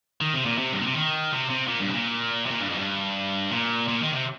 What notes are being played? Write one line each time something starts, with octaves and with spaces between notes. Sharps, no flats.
D#3
C3
A#2
C3
G2
A#2
C3
D#3
C3
C3
A#2
G2
C3
A#2
C3
A#2
G2
F2
G2
A#2
A#2
D#3
C3